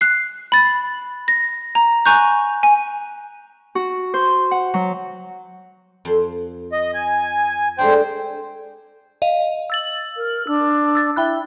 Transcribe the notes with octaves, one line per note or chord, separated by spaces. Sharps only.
F#6 C7
B5 A6
A#6
A#5
G#5 A#5 C#6 F#6 G6
G#5
F#4
C5
F#5
F#3
F2 C5 C6
D#5
G#5
G#3 A3 D4 C5 G5
D#5 F5
E6 A6 F#7
A#4
D4 E6
E6 A6
E4 G5 B5 F#6